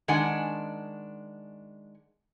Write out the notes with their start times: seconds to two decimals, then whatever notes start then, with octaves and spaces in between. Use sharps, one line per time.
0.08 D#3 G#3 D4 F#5 G#5